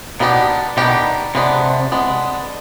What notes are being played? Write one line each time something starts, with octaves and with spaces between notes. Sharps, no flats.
B2 D#3 B3 D4 G4
B2 D#3 B3 D4 G4
C3 G#3 B3 D4
G#3 B3 D4